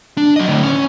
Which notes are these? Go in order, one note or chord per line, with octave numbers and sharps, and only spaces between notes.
D4
F#3 D#5
A2 D3
C#4